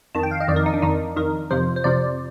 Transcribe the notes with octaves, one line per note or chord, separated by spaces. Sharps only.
F2 D#3 A5
G5
F5
D#5
F2 D#3 D5
A#4
D#4
D4
F2 D#3 D#4
F2 D#3 A#4
F2 C3 F3 C5
C5
F2 C3 F3 D5